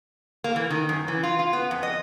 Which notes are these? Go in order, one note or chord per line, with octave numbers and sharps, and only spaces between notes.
A#3
E3
D#3
F#2
E3
F4
F4
B3
F2
D#5